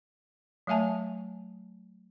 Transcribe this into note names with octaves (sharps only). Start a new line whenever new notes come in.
F#3 A3 E5 G#5 A5